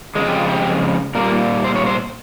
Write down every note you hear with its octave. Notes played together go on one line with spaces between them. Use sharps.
F2 C#3 F3 G#3 G#4
G4
F4
G4
A#2 G3 A#3 A#4
C5
C#5
C5